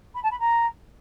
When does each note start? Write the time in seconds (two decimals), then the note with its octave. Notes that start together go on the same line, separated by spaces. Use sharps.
0.15 B5
0.23 A5
0.32 B5
0.40 A#5